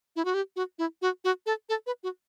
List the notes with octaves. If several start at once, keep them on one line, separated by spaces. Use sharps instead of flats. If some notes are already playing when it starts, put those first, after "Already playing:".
E4
F#4
G4
F#4
E4
F#4
F#4
A4
A4
B4
F#4